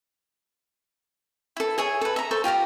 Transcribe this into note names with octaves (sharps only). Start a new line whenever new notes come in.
E4 A4
G#4 C#5 E5 G#5
A4 B4
E5 A#5
A4 C5 C#6
F4 G4 F5 A#5